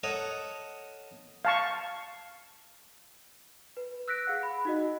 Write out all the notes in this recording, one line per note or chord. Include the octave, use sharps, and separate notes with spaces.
A4 A#4 C#5 D#5 F#5
F5 A5 C#6
B4
E6 F#6 A#6 B6 D7
G#4 F5 F#5
B5
D#4 F#4 D#5